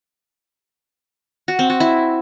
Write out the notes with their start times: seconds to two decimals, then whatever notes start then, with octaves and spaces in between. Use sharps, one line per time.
1.48 F#4
1.59 C4
1.70 F#4
1.80 E4